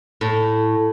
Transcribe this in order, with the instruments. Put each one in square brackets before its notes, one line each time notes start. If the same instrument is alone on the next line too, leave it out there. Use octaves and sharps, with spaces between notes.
[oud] A2